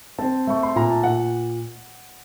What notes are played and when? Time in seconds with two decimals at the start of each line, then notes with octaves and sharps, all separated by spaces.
0.18 C4 A5
0.47 A3 C#6
0.63 C6
0.76 A#2 A#5
0.90 A5
1.03 A#2 F#5